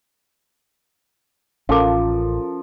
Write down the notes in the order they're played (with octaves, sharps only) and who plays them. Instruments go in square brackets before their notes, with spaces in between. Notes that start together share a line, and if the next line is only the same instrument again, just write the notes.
[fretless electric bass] A1 [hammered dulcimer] F3 [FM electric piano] C#4 A4 A#4 [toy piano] F5 A5 D6